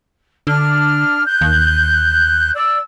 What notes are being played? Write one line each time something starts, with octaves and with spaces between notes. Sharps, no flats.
D3 D4 F6
F#6 G6
D#2
D5 E6